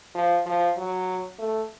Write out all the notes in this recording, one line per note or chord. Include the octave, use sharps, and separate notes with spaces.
F3
F3
F#3
A3